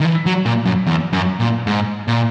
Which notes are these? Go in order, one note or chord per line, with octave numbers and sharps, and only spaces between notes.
D#3
E3
F#3
A#2
F#2
E2
F#2
A#2
G#2
A#2